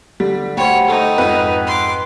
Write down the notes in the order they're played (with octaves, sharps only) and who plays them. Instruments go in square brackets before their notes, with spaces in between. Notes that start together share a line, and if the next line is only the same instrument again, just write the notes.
[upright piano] D3 [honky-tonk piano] G3
[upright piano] D2 C5 [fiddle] C#5 [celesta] F#5 G5 B5
[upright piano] A3 A4 [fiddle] D#4
[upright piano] F2 G#2 [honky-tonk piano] B4
[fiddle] C6 D6